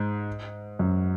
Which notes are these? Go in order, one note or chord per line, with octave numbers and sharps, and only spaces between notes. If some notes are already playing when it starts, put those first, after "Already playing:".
Already playing: G#2
F#2